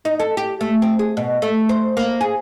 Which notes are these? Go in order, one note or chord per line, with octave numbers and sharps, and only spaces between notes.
D#4
A4
G4
A3
C4
G#4
B2
A3
C5
A#3
G#4